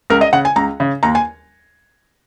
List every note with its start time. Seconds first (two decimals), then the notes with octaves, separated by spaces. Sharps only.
0.10 C#2 A#4
0.21 D#5
0.33 C#3 F#5
0.45 G#5
0.56 C#2 A#5
0.80 C#3
1.03 D#2 A#5
1.15 G#5